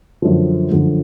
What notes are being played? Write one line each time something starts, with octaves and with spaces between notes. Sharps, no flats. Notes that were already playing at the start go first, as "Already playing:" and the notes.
F#2 D3 F3
F#2 D3 F3